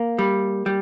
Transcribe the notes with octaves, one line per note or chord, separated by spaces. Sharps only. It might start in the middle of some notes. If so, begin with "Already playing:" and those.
Already playing: A#3
G3
G3